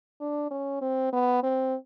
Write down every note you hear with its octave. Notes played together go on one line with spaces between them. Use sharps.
D4
C#4
C4
B3
C4